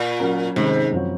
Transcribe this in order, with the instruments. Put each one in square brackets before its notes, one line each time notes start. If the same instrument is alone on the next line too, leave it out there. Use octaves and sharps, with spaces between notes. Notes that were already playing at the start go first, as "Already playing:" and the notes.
Already playing: [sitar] A#2
[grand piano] F#3 C#4 F#4 A#4
[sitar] G#2 [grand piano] C3 D#3 G#3 C#4
[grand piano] F#2 F3 C4 F#4 C#5